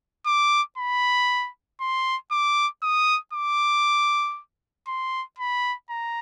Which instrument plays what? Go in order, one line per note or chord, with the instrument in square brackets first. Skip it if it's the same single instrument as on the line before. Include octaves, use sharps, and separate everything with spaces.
[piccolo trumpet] D6
B5
C6
D6
D#6
D6
C6
B5
A#5